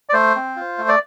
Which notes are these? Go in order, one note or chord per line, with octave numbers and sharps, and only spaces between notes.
D5
A3 C5
C4
F4
A3
D5